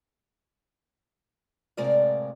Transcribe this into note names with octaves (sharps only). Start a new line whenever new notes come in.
A2 C3 G#3 A#4 D5 F5